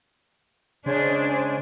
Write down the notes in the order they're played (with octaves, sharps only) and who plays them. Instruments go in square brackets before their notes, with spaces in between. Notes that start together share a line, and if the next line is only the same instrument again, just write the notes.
[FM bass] C#3 [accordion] G#3 C5 G#5 [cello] D4 [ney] C#5